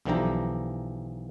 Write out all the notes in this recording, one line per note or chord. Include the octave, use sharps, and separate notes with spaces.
B1 D3 E3 F3 G4 A#5